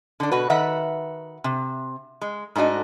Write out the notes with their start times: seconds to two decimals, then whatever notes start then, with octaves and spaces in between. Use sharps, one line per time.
0.20 D3 D4
0.32 B2 F#4 B4
0.50 D#3 B4 E5 F#5
1.44 C3
2.21 G#3
2.55 G#2 A3 D4 F#4 D#5